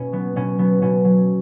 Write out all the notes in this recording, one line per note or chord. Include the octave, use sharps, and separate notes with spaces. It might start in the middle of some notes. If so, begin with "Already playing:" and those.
Already playing: B2 C#4
F#3 B3
B2 C#4
F#3 B3
B2 C#4
F#3